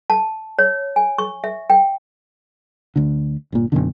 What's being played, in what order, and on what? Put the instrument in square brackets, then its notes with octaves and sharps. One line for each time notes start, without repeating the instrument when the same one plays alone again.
[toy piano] A5
C#5
G#5
C#6
E5
G5
[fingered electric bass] D2 D3
G1 A#2
F#1 F#2 B2 D3